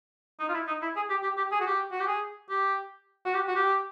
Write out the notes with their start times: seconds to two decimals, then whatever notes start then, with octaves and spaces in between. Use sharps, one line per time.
0.40 D#4
0.49 F4
0.54 E4
0.68 D#4
0.82 E4
0.96 G#4
1.10 G4
1.23 G4
1.37 G4
1.52 G#4
1.61 F#4
1.66 G4
1.92 F#4
2.00 G4
2.07 G#4
2.50 G4
3.26 F#4
3.34 G4
3.48 F#4
3.56 G4